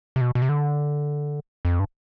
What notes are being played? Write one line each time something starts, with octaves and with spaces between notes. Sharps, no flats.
C3
B2
B2
C3
D3
F2
G2